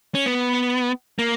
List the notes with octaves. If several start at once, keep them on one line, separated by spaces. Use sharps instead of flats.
C#4
B3
A#3